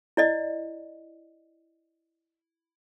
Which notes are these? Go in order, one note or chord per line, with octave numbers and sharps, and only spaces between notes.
E4 D5 D#5